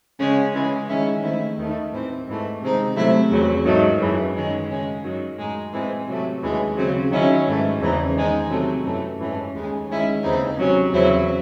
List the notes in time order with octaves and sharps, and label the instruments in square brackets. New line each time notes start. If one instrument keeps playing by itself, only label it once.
[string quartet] C#3 G#3 C#4
C#3 E3 G#3
D#3 G#3 C#4 E4
D#3 A3 C4 E4
D#2 D#3 A3
A2 E3 C4
G#2 E3 A3
C3 D#3 G#3 C4 D#4
C3 F#3 A3 C4 E4
E2 C#3 F#3 C4
G#2 D#3 F#3 A3
F#2 C#3 E3
D#3 G#3 C#4
C#3 G#3 C#4
F#2 D#3 F#3
A2 G#3 D#4
A2 E3 G#3 C4
C3 F#3 A3
D#2 C#3 E3 G#3
C#3 F#3 C4
D#3 F#3 C#4 E4
G#2 E3 A3
E2 C#3 E3 C4 D#4
D#3 G#3 D#4
C3 F#3 A3 C4
F#2 E3 A3 C#4
G#2 E3 A3 C#4
D#2 C#3 G#3
D#3 G#3 C#4 E4
D#2 C#3 E3 C4 D#4
C3 F#3 C#4
E2 C#3 F#3 C4 E4